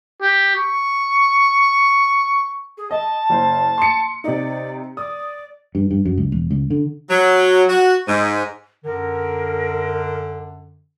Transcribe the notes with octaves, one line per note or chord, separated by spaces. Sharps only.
G4
C#6
G#4
D#5 A5
F#1 C5
C6 C#7
C3 D#4 D5
D5 D#6
G2
G2
F#2
C#2
E1
C#2
D3
F#3
F#4
G#2
F#2 D3 A#4